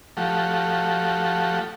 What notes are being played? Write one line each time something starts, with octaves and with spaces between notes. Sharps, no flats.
F3 A3 F#4 G4